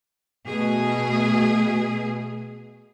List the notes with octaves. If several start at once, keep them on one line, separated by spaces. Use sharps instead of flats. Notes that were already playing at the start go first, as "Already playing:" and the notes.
B2 A3 G#4